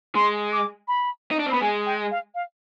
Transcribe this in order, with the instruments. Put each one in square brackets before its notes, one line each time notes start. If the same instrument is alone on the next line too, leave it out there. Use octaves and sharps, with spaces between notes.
[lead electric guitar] G#3 [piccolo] C6
[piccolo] D6
B5
[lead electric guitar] D#4
D4
C4
[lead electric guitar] B3 [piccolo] B5
[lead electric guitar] G#3 [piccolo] G#5
[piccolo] G5
F5
F5